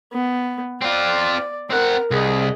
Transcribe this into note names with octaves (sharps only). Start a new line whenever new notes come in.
B3
C4 F4 D5
C4 A#4 F#5
C2 G#4 D#5